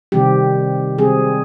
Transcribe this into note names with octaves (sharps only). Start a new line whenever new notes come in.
C3 D#3 G3 C4 G4
C3 D#3 G3 C4 G#4